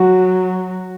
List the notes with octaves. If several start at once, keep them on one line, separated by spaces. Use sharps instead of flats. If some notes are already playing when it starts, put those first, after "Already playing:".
Already playing: F#3 F#4